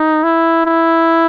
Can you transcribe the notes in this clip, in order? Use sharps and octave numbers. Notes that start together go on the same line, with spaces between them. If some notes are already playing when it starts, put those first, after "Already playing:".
Already playing: D#4
E4
E4